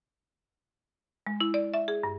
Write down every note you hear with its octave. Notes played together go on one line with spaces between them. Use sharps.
G#3
E4
D5
E5
G#4
G2